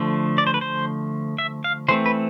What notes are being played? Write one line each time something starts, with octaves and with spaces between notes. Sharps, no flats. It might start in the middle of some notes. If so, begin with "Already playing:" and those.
Already playing: D3 F3 A3
D5
C5
B4
C5
E5
F5
E3 A3 C4 C5
B4